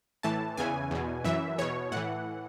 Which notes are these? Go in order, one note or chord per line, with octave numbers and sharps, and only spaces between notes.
A2 E3 A5
E2 C#3 E3 G#5
E2 B2
F#2 E3 E5
E2 B2 C#5
A2 E3 F#5